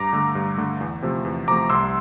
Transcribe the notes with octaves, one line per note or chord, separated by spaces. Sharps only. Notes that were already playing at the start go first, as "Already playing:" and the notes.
Already playing: G2 A#5 D6
D3 A3
G2
D3 A3
E2
C3 F3 A3
E2
C3 F3 A3 A#5 D6
C2 C6 E6